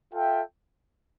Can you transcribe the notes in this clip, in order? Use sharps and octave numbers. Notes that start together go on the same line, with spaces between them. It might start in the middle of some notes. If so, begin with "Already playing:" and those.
F4 A4 E5 G5